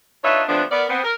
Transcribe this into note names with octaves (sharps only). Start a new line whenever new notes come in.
D4 D#4 F4 B4 C#5 E5
D3 F3 A3 B3 C4 D4
B3 A#4 D5
B3 C4
A#4